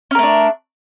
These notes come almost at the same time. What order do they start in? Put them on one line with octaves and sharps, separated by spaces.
C#4 A#4 A3 D4